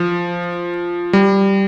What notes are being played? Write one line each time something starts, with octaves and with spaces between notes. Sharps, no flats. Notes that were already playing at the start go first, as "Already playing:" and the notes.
Already playing: F3
G3